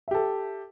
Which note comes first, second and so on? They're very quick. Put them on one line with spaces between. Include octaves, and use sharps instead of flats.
E5 G4 A4